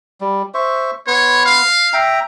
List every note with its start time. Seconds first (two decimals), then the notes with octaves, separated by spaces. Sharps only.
0.21 G3
0.54 C5 E5 C#6
1.07 B3 B4 C#5 C6
1.46 F5
1.93 E5 G5 A#5